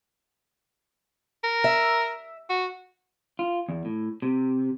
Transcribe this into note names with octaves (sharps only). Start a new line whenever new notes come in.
A#4
E5
F#4
F4
E2
A2
C3